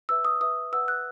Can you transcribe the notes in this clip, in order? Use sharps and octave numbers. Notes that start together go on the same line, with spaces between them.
B4 E5 E6
D#6
B4 E5 D#6
B4 F#5 E6
F#6